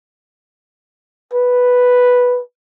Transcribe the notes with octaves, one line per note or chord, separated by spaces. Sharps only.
B4